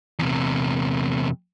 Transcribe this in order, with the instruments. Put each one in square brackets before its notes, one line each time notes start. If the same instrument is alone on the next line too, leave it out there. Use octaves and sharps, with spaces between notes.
[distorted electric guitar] E2 C3